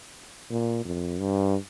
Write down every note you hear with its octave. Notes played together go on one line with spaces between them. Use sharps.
A#2
F2
G2